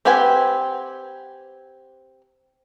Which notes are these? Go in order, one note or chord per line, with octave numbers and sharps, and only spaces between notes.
C4 G4 B4 F#5 G#5